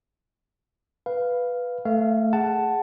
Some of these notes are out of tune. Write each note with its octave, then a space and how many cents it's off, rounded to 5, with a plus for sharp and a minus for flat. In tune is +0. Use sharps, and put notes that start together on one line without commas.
B4 +0 F5 +0
A3 +5 F5 -15
G#4 +0 F#5 +15 A5 +0